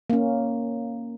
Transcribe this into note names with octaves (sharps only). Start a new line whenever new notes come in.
A#3 C#4